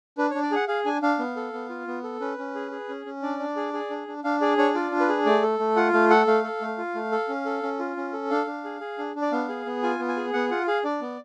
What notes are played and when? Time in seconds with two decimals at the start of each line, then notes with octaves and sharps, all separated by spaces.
0.18 D4 B4
0.30 C#5
0.35 D4
0.43 D5
0.51 G#4 F#5
0.68 G#4 F5
0.85 D4 G#5
1.02 D4 F5
1.19 B3
1.36 A4
1.53 B3
1.69 F4
1.87 B3
2.03 A4
2.20 C#4 B4
2.38 C#4
2.55 G#4
2.71 G#4
2.89 C#4
3.06 C#4
3.22 D4 D5
3.39 D4
3.56 G#4
3.73 G#4
3.90 D4
4.08 D4
4.24 D4 F5
4.41 G#4 D5
4.58 D4 C#5
4.74 F4 D5
4.92 D4
5.00 B4
5.09 G#4
5.25 A3 D5
5.42 A4
5.59 A3
5.76 F4 F#5
5.93 A3 F5
6.10 A4 F#5
6.27 A3 F5
6.44 A4
6.61 A3
6.78 F4
6.95 A3
7.12 A4
7.29 C#4
7.45 A4
7.63 C#4
7.79 F4
7.97 C#4
8.13 A4
8.30 D4 F5
8.47 D4
8.64 G#4
8.81 G#4
8.98 D4
9.16 D4
9.22 D5
9.32 B3 F5
9.49 G#4
9.66 B3
9.83 F4 G#5
9.99 B3
10.08 G#5
10.16 G#4
10.33 B3 F#5
10.51 F4 F#5
10.67 G#4 F5
10.84 D4 D5
11.01 B3